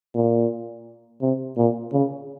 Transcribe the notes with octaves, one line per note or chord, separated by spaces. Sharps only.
A#2
C3
A#2
C#3